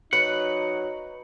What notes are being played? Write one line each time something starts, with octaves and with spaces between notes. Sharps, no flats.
F#3 D#4 B4 F#5